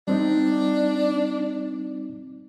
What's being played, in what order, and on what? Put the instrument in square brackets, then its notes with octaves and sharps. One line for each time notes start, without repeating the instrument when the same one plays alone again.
[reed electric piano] G3 C4 D#4 [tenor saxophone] D4